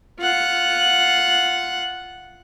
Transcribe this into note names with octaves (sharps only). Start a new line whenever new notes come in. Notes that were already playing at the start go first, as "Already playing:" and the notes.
F4 F#5